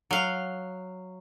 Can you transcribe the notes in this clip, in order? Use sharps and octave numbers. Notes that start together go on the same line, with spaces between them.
F#3 F5